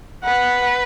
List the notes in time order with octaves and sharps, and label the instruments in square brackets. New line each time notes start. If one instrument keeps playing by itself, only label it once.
[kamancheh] B4 [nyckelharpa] F#5